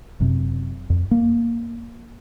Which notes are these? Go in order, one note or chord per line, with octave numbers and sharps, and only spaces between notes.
F#1 F#2 C3
F2
A#3